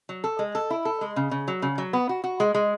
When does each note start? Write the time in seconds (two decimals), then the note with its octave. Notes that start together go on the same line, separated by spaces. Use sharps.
0.09 F#3
0.24 A4
0.39 G#3
0.55 A4
0.70 E4
0.85 A4
1.01 G#3
1.16 C#3
1.31 C#3
1.48 F#3
1.62 C#3
1.78 F#3
1.93 B3
2.09 F#4
2.24 F#4
2.40 G#3
2.54 G#3